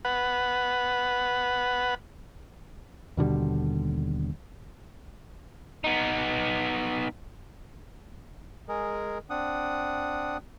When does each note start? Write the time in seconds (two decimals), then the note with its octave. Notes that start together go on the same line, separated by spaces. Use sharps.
0.05 B4 F#5
3.17 D#2 B2 D3 G3
5.84 B3 D#4
8.69 G#3 G#4 A#4
9.30 C4 D4 F#5 D#6